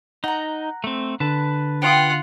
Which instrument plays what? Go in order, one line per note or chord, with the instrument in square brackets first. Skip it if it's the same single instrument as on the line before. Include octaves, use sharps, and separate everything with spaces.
[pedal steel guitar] D#4 [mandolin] F#5 A#5
[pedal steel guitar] A3 C4
[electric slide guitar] D3 [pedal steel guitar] B4 A5
[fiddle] F4 F#5 [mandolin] G5 D6 D#6